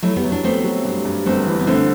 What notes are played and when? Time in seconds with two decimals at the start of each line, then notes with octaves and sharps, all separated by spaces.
0.03 F#3 A3 E4
0.16 G3 B3
0.24 F#3
0.32 D4
0.44 A3 B3 C4
0.64 F#3
0.85 G2
1.05 G2
1.26 G1 A3 C4
1.46 E3
1.60 B3
1.67 D3 A3 C4